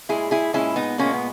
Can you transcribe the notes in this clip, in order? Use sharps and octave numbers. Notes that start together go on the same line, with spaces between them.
A#2 G#3 E4 G#4
E4 G#4
A#2 G#3 C#4 E4
B3 D#4
A#2 G#3 A#3 C#4
B3